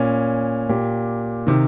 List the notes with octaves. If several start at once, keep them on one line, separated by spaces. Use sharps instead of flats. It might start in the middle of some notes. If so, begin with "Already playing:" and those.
Already playing: A#2 C#4
A#2 G4
C3 D#3